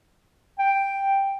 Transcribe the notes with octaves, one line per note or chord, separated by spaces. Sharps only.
G5